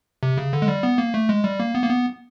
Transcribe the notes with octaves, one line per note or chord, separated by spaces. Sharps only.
C3
C#3
D3
G#3
G3
B3
A#3
A3
G#3
G3
A#3
B3
A#3
B3